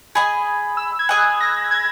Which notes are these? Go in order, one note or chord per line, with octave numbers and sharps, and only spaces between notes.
G#4 D#5 G#5 B5
E6
G#6
G#4 D#5 G#5 F#6
A#6
G#6